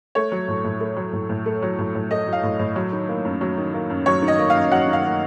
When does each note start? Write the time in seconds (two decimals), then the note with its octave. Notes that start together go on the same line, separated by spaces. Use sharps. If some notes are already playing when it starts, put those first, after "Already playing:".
0.15 A3 C#5
0.32 F#3
0.48 A2
0.64 A2
0.80 A3
0.96 F#3
1.13 A2
1.29 A2
1.46 A3
1.62 F#3
1.79 A2
1.95 A2
2.11 A3 D#5
2.27 F#3
2.33 F5
2.43 A2
2.59 A2
2.76 F#3
2.92 D#3
3.09 A#3
3.25 F#2
3.41 F#3
3.58 D#3
3.74 A#3
3.90 F#2
4.06 F#3 C#5
4.22 D#3
4.28 D#5
4.39 A#3
4.50 F#2 F5
4.71 F#3 F#5
4.87 D#3
4.93 F5
5.04 A#3